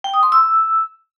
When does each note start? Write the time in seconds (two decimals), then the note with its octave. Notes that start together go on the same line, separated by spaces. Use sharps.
0.04 G5
0.14 D#6
0.23 C6
0.32 E6